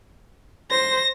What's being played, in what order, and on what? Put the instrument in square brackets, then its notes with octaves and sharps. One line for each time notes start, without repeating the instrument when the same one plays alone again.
[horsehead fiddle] C5 [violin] A#6